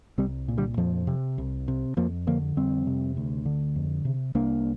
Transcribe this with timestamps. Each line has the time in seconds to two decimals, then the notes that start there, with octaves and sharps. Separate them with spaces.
0.18 C2 G3 C4
0.48 A#2
0.57 D3 G3
0.77 F2 F3
1.07 C3
1.38 C2
1.68 C3
1.97 F2 F3 A#3
2.27 D3 F3 A#3
2.56 F2 G3 C4
2.87 C3
3.17 D2
3.46 D3
3.76 F2
4.05 C3
4.35 C2 A#3 D4